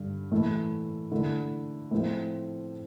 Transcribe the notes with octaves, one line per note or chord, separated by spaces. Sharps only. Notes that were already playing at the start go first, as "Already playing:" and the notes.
Already playing: G2 D3
A2 E3 A3 E4
D3 A3 E4
A2 F3 C4